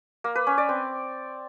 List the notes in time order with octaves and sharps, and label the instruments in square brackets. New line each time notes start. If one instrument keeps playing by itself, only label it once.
[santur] A#3
B4
C#4
D5
C4